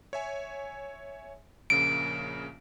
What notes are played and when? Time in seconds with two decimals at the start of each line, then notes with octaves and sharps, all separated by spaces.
0.13 C#5 E5 G#5
1.70 A#1 C#3 A#3 D7